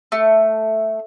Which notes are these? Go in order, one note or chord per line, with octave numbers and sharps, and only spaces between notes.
A3